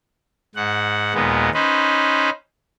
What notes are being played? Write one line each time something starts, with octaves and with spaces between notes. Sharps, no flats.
G#2 F#5
D#2 A#2 G#3 B3
C#4 D#4 B4 C5